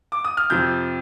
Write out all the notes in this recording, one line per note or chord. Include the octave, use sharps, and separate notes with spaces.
D6
D#6
F6
F2 C3 F3 C4 G6